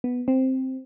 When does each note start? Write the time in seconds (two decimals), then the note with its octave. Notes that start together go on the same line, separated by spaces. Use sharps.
0.04 B3
0.28 C4